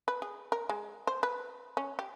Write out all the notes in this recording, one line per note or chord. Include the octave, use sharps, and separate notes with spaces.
B4
G#4
A#4
G#3
C5
B4
C#4
G4